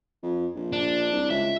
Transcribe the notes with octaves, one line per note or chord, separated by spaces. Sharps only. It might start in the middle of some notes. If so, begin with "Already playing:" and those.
F2
A#1
D4
C2
C#2 E5